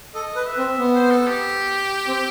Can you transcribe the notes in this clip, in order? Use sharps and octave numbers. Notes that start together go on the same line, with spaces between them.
A4 D#5
B4
E5
C4
B3
C5
A4
G4
C4